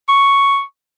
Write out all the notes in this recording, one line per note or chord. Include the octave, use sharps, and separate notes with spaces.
C#6